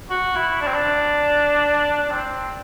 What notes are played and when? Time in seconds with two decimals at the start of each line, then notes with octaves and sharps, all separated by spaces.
0.10 F#4
0.35 E4
0.61 D4
0.67 C4
0.74 D4
2.03 D4
2.11 C4